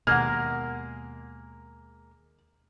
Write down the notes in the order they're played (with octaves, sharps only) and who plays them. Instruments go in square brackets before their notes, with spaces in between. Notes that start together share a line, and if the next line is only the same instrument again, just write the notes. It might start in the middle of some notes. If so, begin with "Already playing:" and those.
[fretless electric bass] D#2 B2 [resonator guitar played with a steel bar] G#3 A#3 [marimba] F#5 G#6 [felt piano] F6